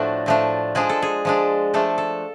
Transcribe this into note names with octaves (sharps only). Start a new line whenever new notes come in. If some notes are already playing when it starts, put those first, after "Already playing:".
Already playing: A2 F3 A3 D4 F#4
A2 F3 A3 D4
F3 G#3 D4 G#4
A4
G#4
F3 G#3 D4
F3 A3 D4 A4
A4